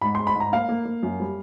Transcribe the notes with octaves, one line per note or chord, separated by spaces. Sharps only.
G#2 B5
G#3 C6
B5
G#2
A#5
A#3 F5
A#3
A#3
F#2
G3